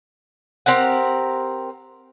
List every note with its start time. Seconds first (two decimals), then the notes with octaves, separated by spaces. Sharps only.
0.66 C4 G4 A#4 F#5